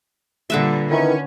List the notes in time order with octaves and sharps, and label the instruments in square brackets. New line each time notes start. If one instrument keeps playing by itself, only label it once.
[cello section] A#2 G3 [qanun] D3 B4 E5
[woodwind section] D#3 E3 [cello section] C#4